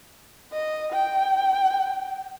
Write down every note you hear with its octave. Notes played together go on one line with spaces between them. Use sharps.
D#5
G5